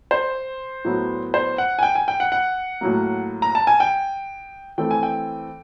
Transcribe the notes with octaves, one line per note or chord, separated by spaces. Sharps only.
C5
A2 F#3 B3
C5
F#5
G#5
G5
G#5
G5
F#5
F#5
A2 F#3 A#3
A#5
A5
G#5
G5
E3 A3 C4 G5
G#5
G5